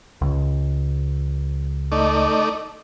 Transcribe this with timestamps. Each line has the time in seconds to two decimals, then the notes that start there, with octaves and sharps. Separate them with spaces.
0.22 C#2
1.92 A3 D#4 D5